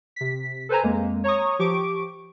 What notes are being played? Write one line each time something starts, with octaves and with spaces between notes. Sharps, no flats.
C3 B6
A4 B4 C5 G#5 A#5
F2 G#3 A#3
C#5 A#5 C#6 D#6
F3 G4 C#6 D6 D7